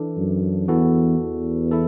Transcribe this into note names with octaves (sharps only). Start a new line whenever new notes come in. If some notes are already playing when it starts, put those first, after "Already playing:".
Already playing: E3 D4 A4
F#2
E2 E3 B3 F#4 A4
E2
E4 A4